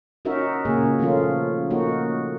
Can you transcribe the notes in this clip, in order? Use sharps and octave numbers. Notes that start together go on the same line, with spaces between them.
C#4 D#4 F#4 A#4 E5
A#2 C#3 A#3 G#4
D#3 F3 A3 C#4 F4
A#3 D#4 F#4